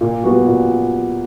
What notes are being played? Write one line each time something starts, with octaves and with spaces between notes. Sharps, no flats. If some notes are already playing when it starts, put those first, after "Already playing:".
A#2
G3 B3 F#4
A#2